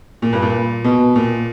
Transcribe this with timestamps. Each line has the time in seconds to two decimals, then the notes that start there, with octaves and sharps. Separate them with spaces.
0.22 A#2
0.33 G2
0.42 A#2
0.84 B2
1.16 A#2